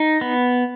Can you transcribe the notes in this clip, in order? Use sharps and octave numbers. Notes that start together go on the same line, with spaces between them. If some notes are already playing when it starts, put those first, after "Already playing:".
Already playing: D#4
B3